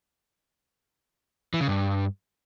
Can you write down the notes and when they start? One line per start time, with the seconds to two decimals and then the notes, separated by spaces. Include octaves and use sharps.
1.54 E3
1.61 C#3
1.68 G2